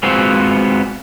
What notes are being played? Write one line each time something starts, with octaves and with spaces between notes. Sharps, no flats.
G#3 B3 C4 F4 F#4 C5